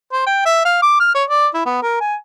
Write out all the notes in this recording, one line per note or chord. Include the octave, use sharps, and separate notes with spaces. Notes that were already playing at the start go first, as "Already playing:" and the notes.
C5
G5
E5
F5
D6
F6
C#5
D5
E4
B3
A#4
G#5